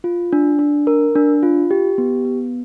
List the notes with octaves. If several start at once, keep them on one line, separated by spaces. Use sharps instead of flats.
F4
D4
D4
A#4
D4
F4
G4
B3
B3